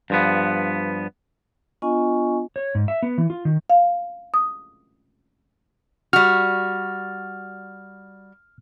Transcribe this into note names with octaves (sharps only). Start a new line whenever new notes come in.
G2 F3 B3
B3 D4 F4 D#5 G#5 C#6
C#5
G#2
E5
B3
E3
F4
D#3
F5
D#6
G3 F#4 F6